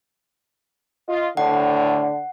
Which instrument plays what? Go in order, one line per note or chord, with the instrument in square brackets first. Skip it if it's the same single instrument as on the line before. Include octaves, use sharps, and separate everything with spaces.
[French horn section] F4 D#5
[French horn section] D2 A2 D4 [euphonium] D3 [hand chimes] F#5